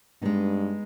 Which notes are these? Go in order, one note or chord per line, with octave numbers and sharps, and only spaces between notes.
G2 G#3 B3 D#4